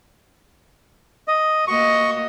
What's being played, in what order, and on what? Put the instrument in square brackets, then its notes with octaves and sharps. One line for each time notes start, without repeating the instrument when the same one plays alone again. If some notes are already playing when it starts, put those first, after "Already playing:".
[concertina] D#5
[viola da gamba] A#3 F#4 D#5 [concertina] C#6